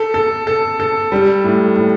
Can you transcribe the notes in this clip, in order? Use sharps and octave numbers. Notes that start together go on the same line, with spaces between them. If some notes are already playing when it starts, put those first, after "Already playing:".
Already playing: A4
A4
A4
A4
G3
A2
A2